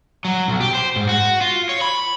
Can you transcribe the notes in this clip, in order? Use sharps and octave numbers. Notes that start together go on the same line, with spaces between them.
F#3
B1
G4
C5
G#2
F#4
F4
C#5
B5